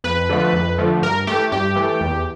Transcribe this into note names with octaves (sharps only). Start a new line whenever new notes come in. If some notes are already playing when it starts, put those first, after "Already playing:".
F2 B4
D3 F3 A3
F2
D3 F3 A3
G2 A#4
E3 A3 G4
G2 G4
E3 A3
E2